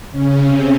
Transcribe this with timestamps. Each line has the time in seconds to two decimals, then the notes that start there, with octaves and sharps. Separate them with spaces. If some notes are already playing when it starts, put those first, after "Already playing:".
0.12 C#3 C#4
0.40 C3 C4